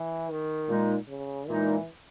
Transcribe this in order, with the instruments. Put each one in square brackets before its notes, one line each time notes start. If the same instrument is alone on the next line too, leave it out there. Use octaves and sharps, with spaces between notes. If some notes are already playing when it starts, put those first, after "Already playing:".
Already playing: [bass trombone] E3
D#3
[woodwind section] A#2 G#3 D#4
[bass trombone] C#3
[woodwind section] A#2 G#3 D#4 [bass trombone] E3